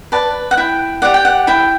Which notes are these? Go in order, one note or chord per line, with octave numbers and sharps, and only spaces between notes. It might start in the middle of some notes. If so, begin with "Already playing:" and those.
B4 D5 A5
F#5
E4 G5
G4 D5 F#5
G5
F#5
E4 G5